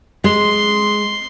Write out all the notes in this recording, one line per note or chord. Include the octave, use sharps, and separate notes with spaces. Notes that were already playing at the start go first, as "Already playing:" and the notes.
G#3 C6